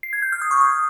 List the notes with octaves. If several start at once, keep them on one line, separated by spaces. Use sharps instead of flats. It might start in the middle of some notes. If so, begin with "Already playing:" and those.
C7
G#6
G6
F6
D#6
C#6
D#6